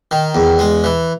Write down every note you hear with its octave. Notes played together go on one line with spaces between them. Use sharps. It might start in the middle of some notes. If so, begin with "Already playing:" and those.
D#3
E2
G#3
E3